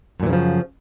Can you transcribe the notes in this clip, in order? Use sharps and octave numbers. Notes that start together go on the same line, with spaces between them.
F#2 A#2 C#3 E3 F3